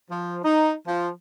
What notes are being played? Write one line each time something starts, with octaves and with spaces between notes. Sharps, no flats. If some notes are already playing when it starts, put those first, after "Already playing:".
F3
D#4
F3